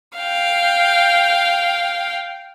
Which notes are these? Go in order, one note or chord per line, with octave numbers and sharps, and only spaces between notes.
F5 G5